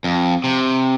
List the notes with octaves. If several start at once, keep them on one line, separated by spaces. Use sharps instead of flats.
F2
C3